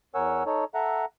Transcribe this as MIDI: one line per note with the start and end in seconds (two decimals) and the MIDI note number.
0.15 0.43 40
0.15 0.43 70
0.15 0.43 73
0.15 0.43 78
0.15 0.43 80
0.15 0.43 88
0.46 0.64 63
0.46 0.64 69
0.46 0.64 73
0.74 1.05 69
0.74 1.05 76
0.74 1.05 78
0.74 1.05 82